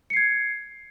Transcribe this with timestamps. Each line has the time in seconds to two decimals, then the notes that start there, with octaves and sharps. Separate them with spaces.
0.10 C#7
0.13 C7
0.17 G#6